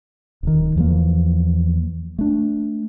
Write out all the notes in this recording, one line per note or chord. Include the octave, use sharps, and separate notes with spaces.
D1 D#3
E2 E3 F3 A#3
A3 D4